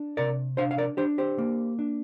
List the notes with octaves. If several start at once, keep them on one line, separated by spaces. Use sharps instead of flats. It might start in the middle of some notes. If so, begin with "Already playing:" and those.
Already playing: D4
C3 A#4 D5
D4 C5 F5
F5
A#4 D5
D4 G4 C5
G4 C5
A#3
D4